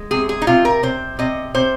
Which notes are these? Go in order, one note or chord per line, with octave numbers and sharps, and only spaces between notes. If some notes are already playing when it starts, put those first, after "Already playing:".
Already playing: G#3
C3 G#4
G#4
D#4
C3 F4
A#4
C3 C5
C3 D#5
C3 C5